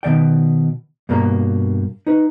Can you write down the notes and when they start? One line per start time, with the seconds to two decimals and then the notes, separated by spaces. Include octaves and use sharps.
0.03 B2 D#3 D5 G5
1.09 G2 B2 A#3 A#5
2.07 D#4 B4